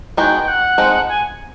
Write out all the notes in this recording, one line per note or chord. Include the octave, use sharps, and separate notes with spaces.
D#3 G#3 B3 D#4 F#4 G5
F#5
F3 G#3 C4 D#4
G#5